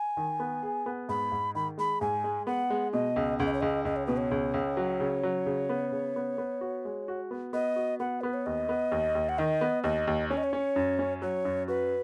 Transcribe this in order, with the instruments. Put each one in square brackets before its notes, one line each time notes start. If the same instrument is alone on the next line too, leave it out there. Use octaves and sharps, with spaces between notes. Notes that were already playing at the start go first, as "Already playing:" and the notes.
Already playing: [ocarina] G#5
[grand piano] D#3
B3
G#4
B3
[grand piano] G#2 [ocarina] B5
[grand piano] G#2
[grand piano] D#3 [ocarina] B5
[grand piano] G#3 [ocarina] B5
[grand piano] G#2 [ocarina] G#5
[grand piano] G#3
[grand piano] B3 [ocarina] F#5
[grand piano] G#3
[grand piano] B2 [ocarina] D#5
[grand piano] C#2
[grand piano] C#2 [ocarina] F#5
[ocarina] D#5
C#5
[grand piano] C#2 [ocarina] D#5
[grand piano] C#2 [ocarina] D#5
[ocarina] C#5
[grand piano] B2 [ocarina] B4
[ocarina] C#5
[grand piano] C#2
C#2
F#3
C#3
F#3
C#3
B3
C#3
B3
B3
F#4
G#3
F#4
B3
[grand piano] B3 [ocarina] D#5
[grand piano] F#4
[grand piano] B3 [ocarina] F#5
[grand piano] B3 [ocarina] B4
[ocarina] C#5
[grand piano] D#2 [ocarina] D#5
[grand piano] B3
D#2
D#2
[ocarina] F#5
[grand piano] D#3 [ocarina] D#5
[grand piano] B3
[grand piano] D#2 [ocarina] D#5
[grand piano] D#2
[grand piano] C#4 [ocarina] C#5
[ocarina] D#5
C#5
[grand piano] C#4
F#2
C#4
[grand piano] F#3 [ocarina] C#5
[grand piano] F#2
[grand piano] F#4 [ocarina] B4